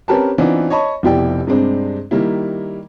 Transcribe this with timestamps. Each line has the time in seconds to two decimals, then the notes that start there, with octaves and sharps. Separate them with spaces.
0.08 C4 C#4 G4 A#4 B4 A5
0.38 E3 B3 C4 D4 D#4 F4
0.70 C#5 D#5 A5 B5 C#6
1.03 F1 B2 E4 G4 D5 G5
1.47 G2 C3 G#3 C4 D4
2.11 D#3 G3 A#3 E4